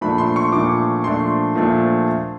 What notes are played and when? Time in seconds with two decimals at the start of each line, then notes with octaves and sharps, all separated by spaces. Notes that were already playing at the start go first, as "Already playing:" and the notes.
0.01 A#2 F3 A3 D4 B5
0.18 C6
0.36 C#6
0.52 A#2 F3 A3 D4 D6
1.04 A#2 F3 A3 D4 C6
1.55 A#2 F3 A3 D4